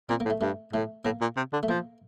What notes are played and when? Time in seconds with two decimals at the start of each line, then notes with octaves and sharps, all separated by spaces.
0.09 A#2 C4
0.20 A#3
0.25 A2
0.30 A3
0.41 G2 A3
0.73 A2 A3
1.05 A2 A#3
1.21 A#2
1.37 C3
1.53 D3
1.63 A3
1.68 F3 A#3